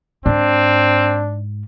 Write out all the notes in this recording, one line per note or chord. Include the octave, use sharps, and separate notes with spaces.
G#2 C4 D4